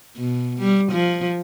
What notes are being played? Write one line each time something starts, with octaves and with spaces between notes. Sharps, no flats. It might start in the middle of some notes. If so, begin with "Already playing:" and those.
B2
G3
F3